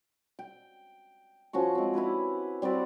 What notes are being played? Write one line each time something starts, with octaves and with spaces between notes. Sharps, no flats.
G5
F3 C#4 F#4 C#6
G#3 C4
E4 G4 B4 C#5
G3 C4 F#4 D5